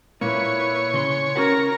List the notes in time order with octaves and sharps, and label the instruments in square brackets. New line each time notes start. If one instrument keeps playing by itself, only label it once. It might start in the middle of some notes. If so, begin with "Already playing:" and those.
[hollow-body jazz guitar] A#2 A#3 [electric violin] E4 B4 [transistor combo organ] C#5
[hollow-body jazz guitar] C#3 C6
[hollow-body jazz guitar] C#4 F#4 B4 [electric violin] A#4 A#6